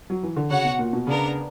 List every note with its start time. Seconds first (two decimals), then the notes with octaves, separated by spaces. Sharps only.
0.10 F#3
0.23 E3
0.36 D3
0.50 C#3 F#4 C#5 F#5
0.64 B2
0.79 A#2
0.93 B2
1.06 C#3 B3 D4 A#4